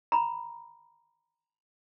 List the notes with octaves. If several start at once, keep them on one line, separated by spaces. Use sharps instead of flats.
A#5 B5